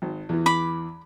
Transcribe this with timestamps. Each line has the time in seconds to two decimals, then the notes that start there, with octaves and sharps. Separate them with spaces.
0.02 G#1
0.29 E2 E3
0.46 B5 D6